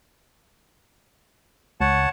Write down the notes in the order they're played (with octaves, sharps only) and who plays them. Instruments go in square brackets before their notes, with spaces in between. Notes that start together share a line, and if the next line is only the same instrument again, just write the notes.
[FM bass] C#2 [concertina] C#5 F#5 A5